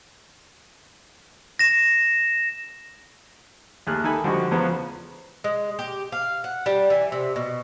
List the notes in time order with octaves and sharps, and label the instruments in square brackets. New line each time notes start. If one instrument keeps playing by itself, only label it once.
[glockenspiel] A#6 E7
[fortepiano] D#2 A3 G#4 F6 F#6
D#3 A4 G#5 B5
D3 F3 G3 G#3 F#4
E2 C#3 F3 B3
[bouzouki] G#3
G4
F5
F#5
G3
E3
C3
B2